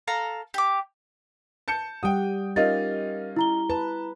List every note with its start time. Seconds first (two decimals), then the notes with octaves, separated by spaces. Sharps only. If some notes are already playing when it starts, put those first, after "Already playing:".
0.08 A4 F5 A#5
0.54 G4 D6
1.68 A5 G6 C#7
2.03 G3 G4 F#5 G5 D#6
2.56 C#4 D#4 F4 G4 A#4 D#5 A6
3.36 E4 A#5 G7
3.70 B4 A5